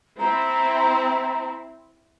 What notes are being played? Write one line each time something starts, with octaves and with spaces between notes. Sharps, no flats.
C4 E4 A#5